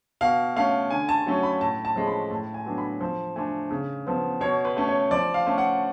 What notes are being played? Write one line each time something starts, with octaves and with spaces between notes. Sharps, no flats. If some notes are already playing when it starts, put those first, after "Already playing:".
B2 F5
A3 C#4 F5
D3 G#5
A5
F#3 A3 C#4
B5
A2 A5
A5
F3 G#3 C#4
B5
A2 A5
G#5
F#3 B3 D4
B5
F3
A3 D4 G#5
C#3
F3 B3
B2 C#5
B4
A3 C#4
C#5
F3 D5
F5
A3 C#4
F#5